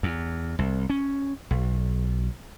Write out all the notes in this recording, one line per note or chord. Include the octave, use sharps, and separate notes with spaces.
E2
C2
C#4
B1